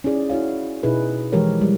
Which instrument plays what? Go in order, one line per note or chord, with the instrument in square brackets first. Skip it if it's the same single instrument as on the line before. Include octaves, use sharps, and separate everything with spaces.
[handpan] C#4 D#4 E4 G#4 D5
E4 F#4 C#5 F5
B2 D#4 E4 G#4 B4
E3 F3 G#3 G4 A#4 C#5
G3 G#3